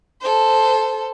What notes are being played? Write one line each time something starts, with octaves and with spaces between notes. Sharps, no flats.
A4 C5